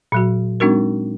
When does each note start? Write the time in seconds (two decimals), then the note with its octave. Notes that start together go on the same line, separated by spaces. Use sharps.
0.12 A#2 F#3 F#4
0.60 G#3 C4 D4 D#4 F#4 A#4